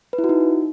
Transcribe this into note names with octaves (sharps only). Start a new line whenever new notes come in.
B4
E4
F#4
D#4